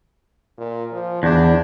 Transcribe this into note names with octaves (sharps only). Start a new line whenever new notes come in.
A#2
F3
E2 D4